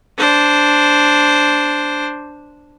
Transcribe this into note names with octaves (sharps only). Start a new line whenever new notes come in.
D4 C5